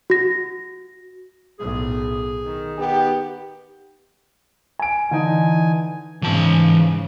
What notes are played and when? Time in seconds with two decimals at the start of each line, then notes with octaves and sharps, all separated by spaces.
0.10 F#4 A#6
1.59 B1 A2 G#4
2.45 D#3
2.78 B3 D#4 G4
4.79 G#5 D7
5.11 D3 E3 D#4 G#5
6.22 G#2 C#3 E3 A5